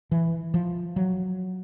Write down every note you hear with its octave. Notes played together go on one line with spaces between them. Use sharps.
E3
F3
F#3